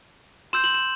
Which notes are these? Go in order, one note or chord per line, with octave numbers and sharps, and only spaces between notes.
C6 E6 G6 E7
F#7
E7